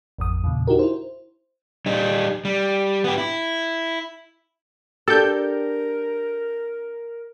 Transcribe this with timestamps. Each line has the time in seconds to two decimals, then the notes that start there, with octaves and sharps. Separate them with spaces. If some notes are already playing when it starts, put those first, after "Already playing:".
0.18 A1 F2 D#6
0.44 E2 A#2 C#3
0.67 D#4 F#4 G4 A#4
0.79 E4 C5
1.86 G3 D#4
2.45 G3
3.04 B3 G4
3.18 E4
5.08 D4 G4 A4 A#4 G6